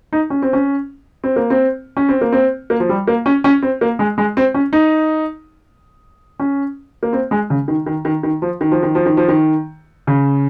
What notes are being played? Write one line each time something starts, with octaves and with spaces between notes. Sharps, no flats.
D#4
C#4
C4
C#4
C4
A#3
C4
C#4
C4
A#3
C4
A#3
F3
G3
A#3
C#4
C#4
C4
A#3
G#3
G#3
C4
C#4
D#4
C#4
A#3
C4
G#3
C#3
D#3
D#3
D#3
D#3
F3
D#3
F3
D#3
F3
D#3
F3
D#3
C#3